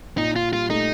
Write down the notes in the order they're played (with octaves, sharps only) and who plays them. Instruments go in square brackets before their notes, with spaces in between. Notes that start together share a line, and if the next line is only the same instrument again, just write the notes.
[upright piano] A#2 [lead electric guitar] D#4
[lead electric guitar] F4
[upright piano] G3 [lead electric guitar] F4
[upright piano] A3 [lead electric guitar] D#4